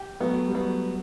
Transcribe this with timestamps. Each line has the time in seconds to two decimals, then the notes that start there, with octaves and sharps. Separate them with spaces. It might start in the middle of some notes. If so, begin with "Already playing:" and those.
Already playing: G4
0.20 F#3 A3 B3
0.47 G3
0.55 F#3 A3 B3